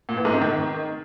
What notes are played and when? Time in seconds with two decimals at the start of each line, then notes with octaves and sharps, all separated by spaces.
0.09 A#2
0.17 E3
0.25 G#2
0.33 C3
0.41 D#3